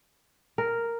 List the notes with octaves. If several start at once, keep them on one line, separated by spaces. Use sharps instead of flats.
A#4